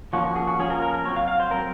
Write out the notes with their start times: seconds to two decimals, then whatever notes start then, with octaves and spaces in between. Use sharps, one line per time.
0.13 F3 A#3 C#4 F#4
0.24 F#4
0.36 G#4
0.47 F#4
0.59 F3 A#3 C#4 G#4
0.70 A#4
0.82 A#4
0.94 A#4
1.05 F#3 C4 C#5
1.16 F5
1.28 F5
1.40 C5
1.50 F#3 C4 A#4